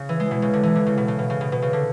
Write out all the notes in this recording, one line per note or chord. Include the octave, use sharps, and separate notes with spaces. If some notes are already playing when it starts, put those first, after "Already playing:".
Already playing: C#3
E3
G#3
B2
C#3
D3
E3
D3
C#3
B2
C#3
B2
C#3
B2
B2
C#3
D3